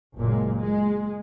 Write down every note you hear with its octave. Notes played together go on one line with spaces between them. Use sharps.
F#1 A#2 G#3
G#3